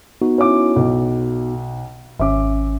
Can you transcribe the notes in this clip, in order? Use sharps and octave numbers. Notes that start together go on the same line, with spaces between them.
B3 D#4 F#4
C#4 E4 D6
B1
G#1 C#4 E5 D6